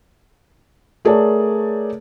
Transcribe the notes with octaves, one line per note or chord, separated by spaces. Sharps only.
A3 G#4 A#4 C#5 D5 A5